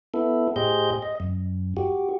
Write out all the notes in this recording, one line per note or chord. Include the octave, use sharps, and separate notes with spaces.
B3 E4 A4
A2 G4 G#4 C5 D#5 G6
D#5
F#2
F#4 G4